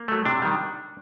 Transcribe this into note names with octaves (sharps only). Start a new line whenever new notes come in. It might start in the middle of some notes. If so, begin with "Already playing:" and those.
Already playing: A#3
F#3 A3
C3 D4
D#3 G3